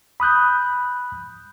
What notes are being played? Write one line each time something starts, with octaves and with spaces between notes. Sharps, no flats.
B5 D#6 F#6 G6